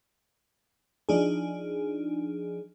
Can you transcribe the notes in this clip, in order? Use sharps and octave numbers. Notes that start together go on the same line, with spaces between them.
F3 D4 D#4 G#4